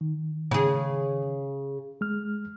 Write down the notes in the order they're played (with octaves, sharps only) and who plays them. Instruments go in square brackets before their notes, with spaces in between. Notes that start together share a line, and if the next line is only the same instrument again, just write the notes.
[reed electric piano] D#3
[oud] C#3 G#4
[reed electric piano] G#3 F6